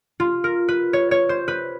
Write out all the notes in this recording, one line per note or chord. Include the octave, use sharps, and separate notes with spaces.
F4
A#4
B4
C#5
C#5
C5
B4